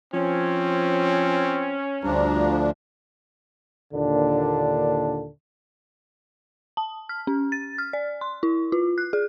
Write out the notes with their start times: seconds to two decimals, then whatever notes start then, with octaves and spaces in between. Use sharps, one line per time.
0.14 F3 C4 C#4
2.04 D2 G2 F3 D4 A#5
3.94 D#2 A#2 D3 D4
6.77 A5
7.09 F6
7.27 C#4
7.52 A6
7.78 F6
7.93 D5
8.21 C6
8.43 E4
8.72 F4
8.98 F#6
9.13 G#4